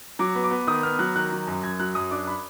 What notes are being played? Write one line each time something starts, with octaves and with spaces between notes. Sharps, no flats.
F#3 D6
B3
D6
B3
D#3 D#6
B3 F6
F#3 F#6
D#3 F#6
F#3
F#2
F#2 G#6
F#3 F#6
F#2 D#6
D4 D6
B5